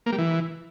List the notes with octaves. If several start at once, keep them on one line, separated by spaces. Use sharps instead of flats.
A#3
G3
E3